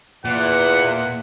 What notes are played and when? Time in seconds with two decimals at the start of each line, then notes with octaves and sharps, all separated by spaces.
0.25 E2 A#2 F#5